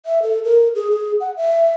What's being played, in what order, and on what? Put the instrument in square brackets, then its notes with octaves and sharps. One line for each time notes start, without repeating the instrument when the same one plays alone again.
[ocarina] E5
A4
A#4
G#4
G#4
F#5
E5